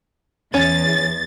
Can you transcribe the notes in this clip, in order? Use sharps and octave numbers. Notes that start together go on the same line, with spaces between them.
E2 C#4 A6